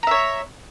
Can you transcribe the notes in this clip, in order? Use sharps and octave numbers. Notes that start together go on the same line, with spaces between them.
C#5 E5 A#5